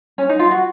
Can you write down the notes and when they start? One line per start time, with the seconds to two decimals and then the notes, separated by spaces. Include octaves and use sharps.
0.18 C#4
0.29 D#4
0.39 F4
0.51 F#4